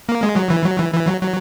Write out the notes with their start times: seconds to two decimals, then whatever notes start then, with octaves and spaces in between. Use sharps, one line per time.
0.09 A#3
0.23 G#3
0.36 F#3
0.50 E3
0.65 F#3
0.79 E3
0.94 E3
1.08 F#3
1.21 F#3